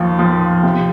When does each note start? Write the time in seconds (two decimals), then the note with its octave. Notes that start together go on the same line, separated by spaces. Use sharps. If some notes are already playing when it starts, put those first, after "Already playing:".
Already playing: D#2 F3
0.19 F3
0.63 C3